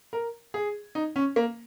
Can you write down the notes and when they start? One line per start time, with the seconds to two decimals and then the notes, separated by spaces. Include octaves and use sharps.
0.13 A#4
0.54 G#4
0.95 D#4
1.16 C#4
1.36 A#3